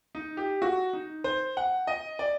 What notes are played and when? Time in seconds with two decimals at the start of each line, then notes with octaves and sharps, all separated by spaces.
0.15 D#4
0.37 G4
0.62 F#4
0.93 D#4
1.24 C5
1.57 F#5
1.87 D#5
2.19 D5